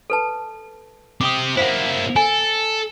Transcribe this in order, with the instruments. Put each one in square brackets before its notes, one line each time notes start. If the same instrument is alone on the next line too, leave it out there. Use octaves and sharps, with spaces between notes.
[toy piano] A4 B4 A5
[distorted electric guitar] C4 G4 [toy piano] D6 D#6
[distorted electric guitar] A#3 E4 [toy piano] C5 F5 F#5
[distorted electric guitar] A4 [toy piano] G#5